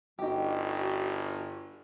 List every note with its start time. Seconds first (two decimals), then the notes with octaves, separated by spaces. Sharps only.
0.19 G1 D#4 F#4 G4